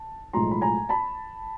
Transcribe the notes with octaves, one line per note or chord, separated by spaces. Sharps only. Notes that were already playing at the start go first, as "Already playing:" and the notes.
Already playing: A5
B1 A2 F3 G#3 A#5 C6
B5
G#5 A#5
A5 B5